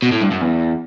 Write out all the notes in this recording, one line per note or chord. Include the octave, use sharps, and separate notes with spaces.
B2
A2
G2
F#2
E2